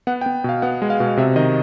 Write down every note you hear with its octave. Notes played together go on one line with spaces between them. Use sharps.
B3 F#5
G5
B3
B2 F5
B3 F#5
G#3
F5
B2
C3 E5
D#3 D#5